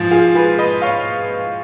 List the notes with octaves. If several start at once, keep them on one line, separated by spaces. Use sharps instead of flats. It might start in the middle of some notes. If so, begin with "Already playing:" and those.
Already playing: G#2 F3
F4 G#4
G#4 B4
B4 D#5
C#5 F5